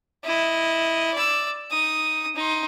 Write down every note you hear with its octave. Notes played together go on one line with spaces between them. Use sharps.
E4 D#5
D5 E6
D#4 D#6
D#4 C6